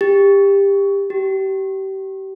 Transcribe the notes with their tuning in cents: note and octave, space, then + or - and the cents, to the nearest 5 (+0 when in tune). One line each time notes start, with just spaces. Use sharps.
G4 +20
G4 -30